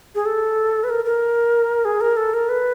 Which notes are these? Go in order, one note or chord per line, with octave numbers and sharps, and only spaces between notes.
G#4
A4
B4
A#4
A#4
G#4
A#4
A4
A#4
B4